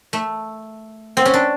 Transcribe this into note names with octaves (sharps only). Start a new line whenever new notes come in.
A3
C4
C#4
D4